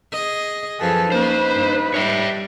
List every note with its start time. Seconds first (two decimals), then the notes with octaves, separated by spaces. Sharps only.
0.12 G#4 D#5
0.80 F#2 F3 G#4 A4 B4
1.12 A#3 C#4 D#4 B4 C5
1.54 G2
1.94 G3 C#5 E5